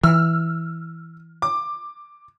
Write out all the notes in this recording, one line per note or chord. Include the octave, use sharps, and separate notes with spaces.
E3 E6 F6
D6